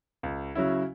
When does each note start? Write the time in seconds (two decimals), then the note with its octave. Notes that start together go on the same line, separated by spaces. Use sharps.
0.23 C#2
0.55 C#3 F#3 C#4 E4